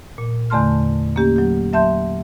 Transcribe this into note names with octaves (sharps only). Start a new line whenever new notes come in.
A#2
E2 D3 A3 A5 C6 F6
A#3 C#4 G4
F#3 G4
F#3 E5 A5 C6 G6